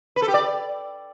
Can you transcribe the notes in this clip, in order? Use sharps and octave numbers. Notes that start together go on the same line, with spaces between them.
B4
A4
G4
D5